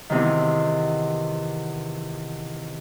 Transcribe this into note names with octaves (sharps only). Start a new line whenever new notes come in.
E2 C3 D#3